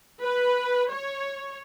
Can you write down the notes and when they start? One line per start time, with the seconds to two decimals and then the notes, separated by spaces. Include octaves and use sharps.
0.21 B4
0.90 C#5